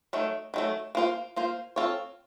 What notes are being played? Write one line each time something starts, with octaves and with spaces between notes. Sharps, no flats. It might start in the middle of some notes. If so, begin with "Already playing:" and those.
D#3 F#3 A3
D#3 F#3 A3
A#3 F4 C5
A#3 F4 C5
C4 F4 A4 C#5